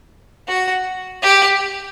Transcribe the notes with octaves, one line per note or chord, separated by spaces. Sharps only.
F#4
G4